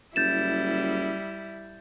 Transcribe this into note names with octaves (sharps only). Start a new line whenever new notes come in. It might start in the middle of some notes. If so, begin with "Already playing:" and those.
F#1 G3 E4 G6 A6 E7